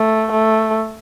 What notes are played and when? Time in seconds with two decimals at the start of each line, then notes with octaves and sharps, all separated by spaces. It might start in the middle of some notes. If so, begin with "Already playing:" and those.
Already playing: A3
0.32 A3